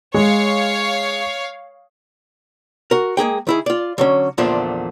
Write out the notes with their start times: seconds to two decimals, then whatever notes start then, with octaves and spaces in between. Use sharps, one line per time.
0.14 G#3 C#5 F5
2.91 F#4 A#4
3.17 G#3 A#3 G#4 G5
3.47 D#3 E4 G#4
3.66 F4 D5
3.98 D3 F#3 C#4
4.38 E2 A#2 D3 F3 A3 D4